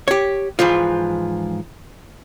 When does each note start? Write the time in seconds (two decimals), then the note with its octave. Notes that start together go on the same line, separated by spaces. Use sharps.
0.08 G4 C#5
0.59 G#2 E3 F3 F4